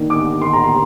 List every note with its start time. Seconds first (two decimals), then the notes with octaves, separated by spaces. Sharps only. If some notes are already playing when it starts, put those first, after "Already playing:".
Already playing: D#3 A#3 D4
0.10 D6
0.41 C6
0.53 A#5
0.64 C6